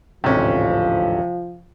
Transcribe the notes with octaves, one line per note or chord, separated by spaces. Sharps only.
A1 D2 G#2 C3 F3 C#4